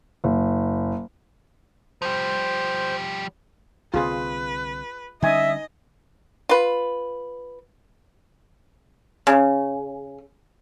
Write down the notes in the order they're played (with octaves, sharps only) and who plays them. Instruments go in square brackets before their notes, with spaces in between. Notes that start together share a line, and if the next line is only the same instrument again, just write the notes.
[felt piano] F#1
[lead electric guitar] F3 G3 [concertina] C5
[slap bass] C2 D3 C4 [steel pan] F4 G#4 [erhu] B4
[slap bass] D3 G3 C#4 [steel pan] D#4 G#5 D#6 [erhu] D#5 [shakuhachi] E5
[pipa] F4 B4
C#3